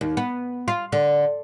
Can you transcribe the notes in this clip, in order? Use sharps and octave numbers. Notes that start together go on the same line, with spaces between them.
D#2
B3
F4
D3